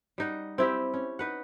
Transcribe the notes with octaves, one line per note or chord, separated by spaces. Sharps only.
G3 D#4 F#5
C4 E4 G4
C#4
D#4 B4 F#5